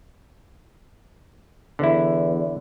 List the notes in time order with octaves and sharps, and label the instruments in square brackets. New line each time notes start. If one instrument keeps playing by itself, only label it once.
[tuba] E2 [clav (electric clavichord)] D3 E4